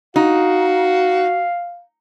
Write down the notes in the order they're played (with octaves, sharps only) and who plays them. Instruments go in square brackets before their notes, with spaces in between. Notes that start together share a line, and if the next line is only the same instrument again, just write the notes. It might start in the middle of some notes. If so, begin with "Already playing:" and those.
[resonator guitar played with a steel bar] D#4 [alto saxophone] F#4 [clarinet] F5